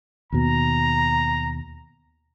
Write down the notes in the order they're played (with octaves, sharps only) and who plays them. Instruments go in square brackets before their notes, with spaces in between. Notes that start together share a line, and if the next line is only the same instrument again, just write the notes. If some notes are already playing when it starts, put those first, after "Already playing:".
[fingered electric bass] D#2 B2 [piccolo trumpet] A#5